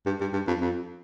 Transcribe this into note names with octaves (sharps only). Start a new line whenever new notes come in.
G2
G2
G2
F2
F2